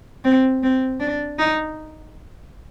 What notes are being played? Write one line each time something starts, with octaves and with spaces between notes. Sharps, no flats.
C4
C4
D4
D#4